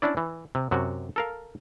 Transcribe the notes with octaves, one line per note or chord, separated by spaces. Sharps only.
C#4 D4 E4 D5
E3
C3
F#2 C3 F#4
A4 A#4 F5